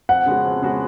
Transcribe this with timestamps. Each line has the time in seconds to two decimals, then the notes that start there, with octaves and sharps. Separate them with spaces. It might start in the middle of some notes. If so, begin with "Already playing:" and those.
0.09 F2 F#5
0.26 C#3 G#3 B3 F#4
0.44 F2
0.61 C#3 G#3 B3 F#4